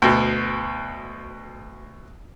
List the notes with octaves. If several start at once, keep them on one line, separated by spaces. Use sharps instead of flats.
D2 B2